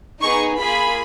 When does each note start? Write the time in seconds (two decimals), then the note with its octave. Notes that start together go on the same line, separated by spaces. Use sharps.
0.21 B3 D#4 G#4 C#6
0.59 A#3 F4 G#4 B5